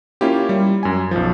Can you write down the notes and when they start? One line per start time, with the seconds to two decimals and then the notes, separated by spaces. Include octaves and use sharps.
0.21 A#3 C#4 E4 F4 G4
0.49 G3
0.83 F#2 G#5
1.11 B1 F3